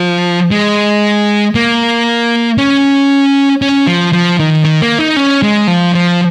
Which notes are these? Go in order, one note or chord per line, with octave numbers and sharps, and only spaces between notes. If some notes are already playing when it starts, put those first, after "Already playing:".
Already playing: F3
G#3
A#3
C#4
C#4
F3
F3
D#3
D#3
A#3
D#4
C#4
G#3
F3
F3